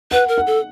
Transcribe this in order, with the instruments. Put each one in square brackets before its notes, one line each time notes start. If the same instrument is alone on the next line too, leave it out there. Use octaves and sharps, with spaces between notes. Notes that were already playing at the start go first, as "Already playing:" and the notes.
[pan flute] B4 [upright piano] F#5
[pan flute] A#4
[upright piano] F#5
[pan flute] A4